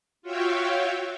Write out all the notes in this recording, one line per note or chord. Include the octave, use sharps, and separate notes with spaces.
F4 F#4 C#5 E5 F5 G5